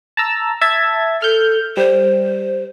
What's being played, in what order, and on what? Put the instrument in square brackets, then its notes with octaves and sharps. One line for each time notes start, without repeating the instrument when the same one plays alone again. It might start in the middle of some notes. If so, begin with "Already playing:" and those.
[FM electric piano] A5 A#5 E6
E5 A5 G#6
[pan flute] A4 [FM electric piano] F6 G6
[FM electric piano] G3 [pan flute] C5